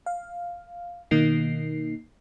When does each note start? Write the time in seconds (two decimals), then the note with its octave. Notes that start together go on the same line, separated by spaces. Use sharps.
0.06 F5
1.11 B2 D#3 A#3 D#4 C7